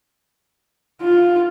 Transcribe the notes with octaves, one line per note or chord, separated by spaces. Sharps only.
F4